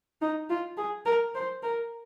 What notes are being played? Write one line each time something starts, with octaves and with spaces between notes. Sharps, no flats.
D#4
F4
G#4
A#4
C5
A#4